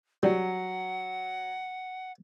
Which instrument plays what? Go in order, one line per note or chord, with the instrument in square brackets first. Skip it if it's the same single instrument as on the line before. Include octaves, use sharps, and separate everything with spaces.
[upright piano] F#3 [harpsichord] G3 [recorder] F#5